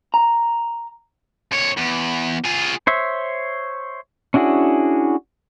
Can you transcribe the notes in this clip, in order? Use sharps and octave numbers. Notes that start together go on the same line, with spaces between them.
A#5
F2 C#5
E2
F4 G#4
C5 C#5 E5
C#4 D4 E4 F#4 G#4